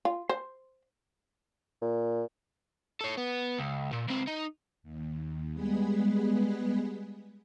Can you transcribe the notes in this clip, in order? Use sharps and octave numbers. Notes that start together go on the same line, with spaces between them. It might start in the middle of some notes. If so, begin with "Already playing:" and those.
F4
C5
A#2
A4 C#5
B3
C#2
A#2
C#2 C4
D#4
D#2
G3 G#3 B3 G#4 B4